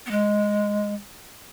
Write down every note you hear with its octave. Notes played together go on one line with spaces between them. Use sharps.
B3
G#3